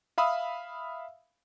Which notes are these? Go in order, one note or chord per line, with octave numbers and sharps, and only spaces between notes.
E5 F5 B5 D#6 E6